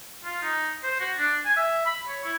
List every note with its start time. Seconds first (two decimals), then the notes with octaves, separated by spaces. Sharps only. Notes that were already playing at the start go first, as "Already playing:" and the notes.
0.25 F4
0.42 D#4
0.83 C5
1.00 F#4
1.17 D4
1.45 G#5
1.56 E5
1.86 B5
2.08 C#5
2.24 E4